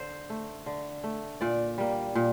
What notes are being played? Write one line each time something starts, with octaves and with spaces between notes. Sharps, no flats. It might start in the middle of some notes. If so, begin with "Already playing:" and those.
Already playing: D3 C5
A3
D3
A3
A#2 D5
G3 A#3
A#2